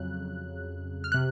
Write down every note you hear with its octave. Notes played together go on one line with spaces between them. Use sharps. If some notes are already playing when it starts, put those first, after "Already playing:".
Already playing: F2 C#3 F#3 F#6
F6
C3 F#6